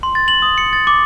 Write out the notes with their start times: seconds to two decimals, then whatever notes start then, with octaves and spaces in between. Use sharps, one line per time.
0.03 C6
0.15 A6
0.28 F#7
0.42 D#6
0.58 C#7
0.73 A6
0.87 D6